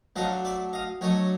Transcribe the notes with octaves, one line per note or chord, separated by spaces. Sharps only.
F#3 A3 D4 D#5 F5
D5 E5
D#5 F5
F#3 A3 D4 C#5 D#5